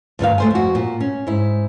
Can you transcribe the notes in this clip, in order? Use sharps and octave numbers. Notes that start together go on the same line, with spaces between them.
D2 G2 D#3 F5
A3 C5 G#5
F2 F#4
A#2
C#4
G#2 E4